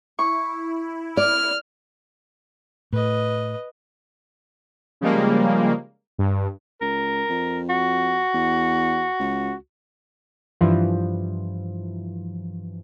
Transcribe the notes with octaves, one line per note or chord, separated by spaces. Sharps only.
E4 C#6
D5 F6
A2 B4 D#5
C#3 F3 G3 G#3 A#3
G2
C#2 A#4
F2
F#4
E2
C#2
G2 E3 F3